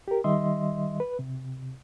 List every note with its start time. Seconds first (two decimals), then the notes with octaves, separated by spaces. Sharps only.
0.08 G4 A#4
0.24 D#3 G3 D#5 E5 C6
1.00 B4
1.19 C3